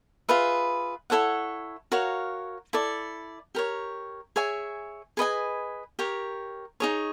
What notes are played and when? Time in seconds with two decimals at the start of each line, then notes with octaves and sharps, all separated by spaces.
0.29 F4 G#4 B4 E5
1.10 E4 A4 C#5 F#5
1.92 F#4 A#4 C#5 F5
2.73 E4 A4 D5
3.55 G4 A#4 C#5
4.36 G#4 C#5 E5 G#5
5.17 G#4 B4 D#5 G#5
5.99 G4 A#4 C#5
6.80 D#4 G#4 C#5